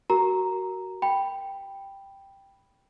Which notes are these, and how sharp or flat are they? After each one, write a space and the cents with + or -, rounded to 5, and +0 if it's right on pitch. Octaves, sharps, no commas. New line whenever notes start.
F#4 +20 A#4 +0 A#5 +0
G5 +0 B5 +0